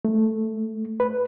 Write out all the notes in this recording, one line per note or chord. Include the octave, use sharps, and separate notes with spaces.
A3
B4